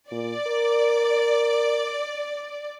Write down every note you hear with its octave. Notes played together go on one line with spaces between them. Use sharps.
A#2 D5
A#4